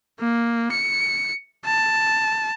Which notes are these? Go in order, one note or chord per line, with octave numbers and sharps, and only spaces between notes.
A#3
C#7
A5